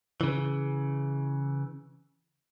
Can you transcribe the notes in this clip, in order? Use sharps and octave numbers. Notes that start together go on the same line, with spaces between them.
C#3 E3